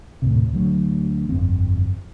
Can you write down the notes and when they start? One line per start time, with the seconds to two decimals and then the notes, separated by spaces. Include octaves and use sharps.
0.22 D#2 A2 C3
0.53 D2 F#3
1.29 G1 F2 C4